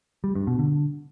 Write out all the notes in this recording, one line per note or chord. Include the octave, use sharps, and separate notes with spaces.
G3
G2
B2
D3